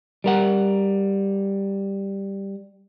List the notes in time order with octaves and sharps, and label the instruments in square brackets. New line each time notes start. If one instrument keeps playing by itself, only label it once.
[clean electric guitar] G3 A#4 F#5